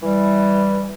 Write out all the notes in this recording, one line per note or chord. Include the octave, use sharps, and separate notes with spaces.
E3 G3